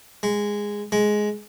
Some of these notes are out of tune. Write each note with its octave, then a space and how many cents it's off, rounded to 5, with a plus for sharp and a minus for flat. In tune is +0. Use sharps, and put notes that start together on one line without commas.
G#3 -10
G#3 +10